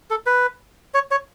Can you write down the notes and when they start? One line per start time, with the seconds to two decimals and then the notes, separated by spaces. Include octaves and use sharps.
0.10 A4
0.26 B4
0.94 C#5
1.11 C#5